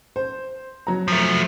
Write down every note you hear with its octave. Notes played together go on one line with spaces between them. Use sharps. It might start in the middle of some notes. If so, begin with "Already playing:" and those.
C5
F#3 A#5
F3 A3